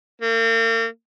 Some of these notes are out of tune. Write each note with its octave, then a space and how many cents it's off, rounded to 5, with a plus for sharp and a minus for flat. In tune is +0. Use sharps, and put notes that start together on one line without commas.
A#3 -40